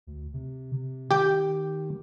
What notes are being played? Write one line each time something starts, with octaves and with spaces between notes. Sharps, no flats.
D2
C3
C3
D#3 G4 G5